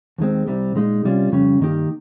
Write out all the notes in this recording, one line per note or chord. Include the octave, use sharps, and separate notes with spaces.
D#2 D#3 G#3 C4
C2 C3 G3 C4
A#2 G#3 D#4
C2 C3 G3 C#4 F4
F2 C#3 G3 C#4
G2 D#3 A#3 D#4 G4